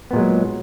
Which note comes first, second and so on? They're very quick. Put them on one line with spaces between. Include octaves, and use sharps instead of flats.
B3 A#2 G#3 F#3